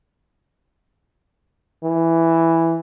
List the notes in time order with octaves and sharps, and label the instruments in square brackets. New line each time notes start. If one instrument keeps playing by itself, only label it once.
[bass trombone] E3